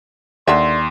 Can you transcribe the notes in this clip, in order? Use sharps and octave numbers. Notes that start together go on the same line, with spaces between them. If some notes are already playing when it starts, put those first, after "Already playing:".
D#2 D3 E5 C6